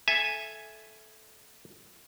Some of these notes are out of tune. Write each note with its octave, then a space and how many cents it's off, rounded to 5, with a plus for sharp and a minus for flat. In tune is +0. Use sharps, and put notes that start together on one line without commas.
A4 -15 E5 +0 G#5 +0